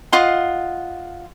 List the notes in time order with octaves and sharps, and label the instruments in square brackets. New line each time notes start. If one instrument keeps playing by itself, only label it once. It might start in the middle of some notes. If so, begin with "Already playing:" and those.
[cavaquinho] F4 D#5 F#5 C6